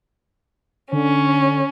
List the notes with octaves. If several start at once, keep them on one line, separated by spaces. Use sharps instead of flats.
D3 C#4